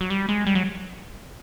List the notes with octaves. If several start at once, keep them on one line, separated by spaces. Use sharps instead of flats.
F#3
G3
G#3
G3
F#3